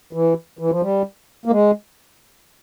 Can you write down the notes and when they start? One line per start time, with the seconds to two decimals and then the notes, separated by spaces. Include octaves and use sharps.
0.13 E3
0.59 E3
0.70 F3
0.82 G3
1.45 A#3
1.50 G#3